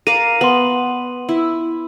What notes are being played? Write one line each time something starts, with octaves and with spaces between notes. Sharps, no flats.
A#4 D5 F5 D#7
B3 C6 F#7
E4